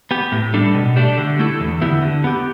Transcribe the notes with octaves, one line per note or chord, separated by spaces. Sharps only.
B3 G4
A2
G3 D4 A4
B2
A3 D4 G4
D3
A3 E4 A4
E2
D3 B3 E4 G4
D3
B3 G4